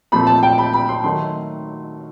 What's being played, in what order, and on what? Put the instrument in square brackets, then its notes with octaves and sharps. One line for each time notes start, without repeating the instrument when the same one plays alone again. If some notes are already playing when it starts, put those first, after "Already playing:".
[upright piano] A#2 F3 A3 C4 B5
A5
G5
B5
B5
C6
D#3 F#3 A3 C6